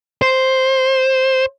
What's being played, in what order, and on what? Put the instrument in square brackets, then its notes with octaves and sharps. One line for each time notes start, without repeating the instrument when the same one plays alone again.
[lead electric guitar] C5